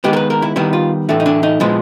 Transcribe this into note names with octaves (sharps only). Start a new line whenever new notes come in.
D#3 G#3 B3 G4
A#4
B4
A#4
E4
D#3 G3 B3 E4
F4
A2 E3 A3 D4
D#4
D4
D#4
A#2 F3 G#3 B3 E4